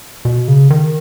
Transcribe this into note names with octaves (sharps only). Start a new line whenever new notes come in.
B2
C#3
D#3